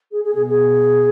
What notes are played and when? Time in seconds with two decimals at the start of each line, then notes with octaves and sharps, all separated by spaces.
0.12 G#4
0.24 G#4
0.35 B2 G#4
0.49 G#4